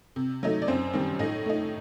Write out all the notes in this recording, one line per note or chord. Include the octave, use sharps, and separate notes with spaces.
C3
F#3 A3 D#4
D5
F#2 C4 C5
D#3 G3 C4
A2 D#4 D#5
A3 D#4